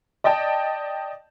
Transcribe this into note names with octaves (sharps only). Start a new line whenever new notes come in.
D5 D#5 G5 A5